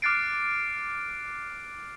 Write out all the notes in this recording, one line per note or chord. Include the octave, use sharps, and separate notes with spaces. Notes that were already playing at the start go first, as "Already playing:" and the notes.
D6 F6 F#6 A6 C7 D7